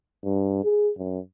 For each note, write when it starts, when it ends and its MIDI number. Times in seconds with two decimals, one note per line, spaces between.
0.24 0.62 43
0.64 0.91 68
0.98 1.19 42